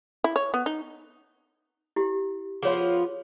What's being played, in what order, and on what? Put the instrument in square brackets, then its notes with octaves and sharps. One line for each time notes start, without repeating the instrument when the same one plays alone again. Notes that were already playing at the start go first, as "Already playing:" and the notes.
[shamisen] E4
C#5
B3
D#4
[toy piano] E4 G4
[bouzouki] F3 B3 F4 [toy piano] G#4 C#5